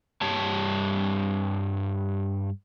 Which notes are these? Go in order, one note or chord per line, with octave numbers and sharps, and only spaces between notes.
G2 G3 C#5 A5